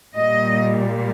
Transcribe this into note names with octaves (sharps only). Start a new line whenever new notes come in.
A#2 G3 D#5